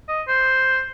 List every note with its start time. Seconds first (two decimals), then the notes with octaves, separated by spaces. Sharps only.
0.08 D#5
0.28 C5